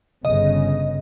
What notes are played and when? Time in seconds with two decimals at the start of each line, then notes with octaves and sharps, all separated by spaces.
0.25 G1 C#3 D#5